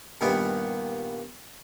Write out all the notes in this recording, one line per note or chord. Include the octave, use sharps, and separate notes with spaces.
G2 A#2 D#3 A#3 B3